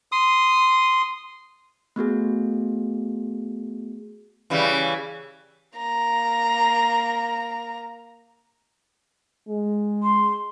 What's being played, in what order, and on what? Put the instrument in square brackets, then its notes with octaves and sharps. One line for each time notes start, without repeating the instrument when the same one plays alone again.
[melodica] C6 D#6
[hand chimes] A3 B3 F#4 G#4
[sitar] C#3 E3 G3
[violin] A#3 A#5
[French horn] G#3
[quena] C6